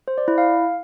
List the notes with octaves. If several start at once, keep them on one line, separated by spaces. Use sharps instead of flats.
C5
D5
E4
F5